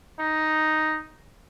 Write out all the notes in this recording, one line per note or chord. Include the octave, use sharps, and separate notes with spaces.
D#4